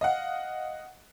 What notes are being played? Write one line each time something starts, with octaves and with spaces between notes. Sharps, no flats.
D#5 F5 F#5